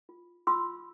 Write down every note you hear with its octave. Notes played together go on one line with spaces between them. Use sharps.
F4
F4 C6 E6